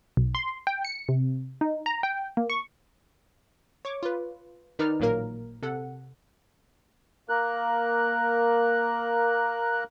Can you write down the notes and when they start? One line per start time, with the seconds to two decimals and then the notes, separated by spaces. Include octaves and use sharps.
0.17 B1
0.35 C6
0.67 G5
0.85 C#7
1.09 C3
1.61 D#4
1.86 A#5
2.03 G5
2.37 A#3
2.50 C#6
3.85 C#5 C#6 D6
4.03 F4 B4
4.79 D#3 D#4 B4 D5 F6
5.00 A1 A#2 F#3 A#3 A#4
5.63 C3 A4 F#5
7.29 A#3 A#4 F#6